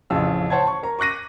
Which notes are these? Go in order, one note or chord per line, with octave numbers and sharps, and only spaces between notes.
A1 F2 C#3 E6
C5 C#5 F#5 A5 C6 G#6
C#6
A#4 A#5
C#6 D6 F#6 A#6 D#7